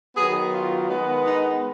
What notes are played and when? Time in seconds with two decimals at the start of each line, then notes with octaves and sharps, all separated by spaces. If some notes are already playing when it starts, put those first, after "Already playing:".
0.16 D#3 F#3 B3 G#4
0.53 F4
0.89 D#3 G#3 B3
1.26 D#4